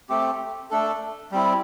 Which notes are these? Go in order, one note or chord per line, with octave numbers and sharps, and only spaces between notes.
A3 C4 G4
A3 D4 A4
G3 C4 E4